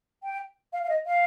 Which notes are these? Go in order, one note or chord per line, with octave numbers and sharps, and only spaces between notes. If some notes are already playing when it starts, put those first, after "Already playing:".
G5
F5
F5
D#5
F5